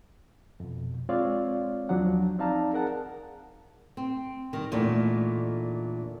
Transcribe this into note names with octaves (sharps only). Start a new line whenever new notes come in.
F2 B2
G#3 C4 F4 C#5 D5 F5
D#2 F3 F#3 D4 F#5
C4 D#4 D5 F5 A5 A#5
G#4 A#4 F#5 A5
C4
D#3 G3
E2 A#2 D3 A3 D#4